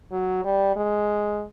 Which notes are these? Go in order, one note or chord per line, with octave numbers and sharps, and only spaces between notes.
F#3
G3
G#3